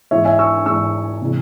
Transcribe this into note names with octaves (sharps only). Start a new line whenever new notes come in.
G#2 E3 G#3 C#5 E5
E5 G#5
C#6 E6
G#2 E3 G#3 C#6 E6
C3 E3 G#3